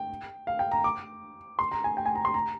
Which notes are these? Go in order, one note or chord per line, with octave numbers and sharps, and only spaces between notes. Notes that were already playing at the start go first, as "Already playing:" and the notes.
Already playing: G5
F5
G5
A#5
D6
C6
A#5
G#5
G5
G#5
A#5
C6
A#5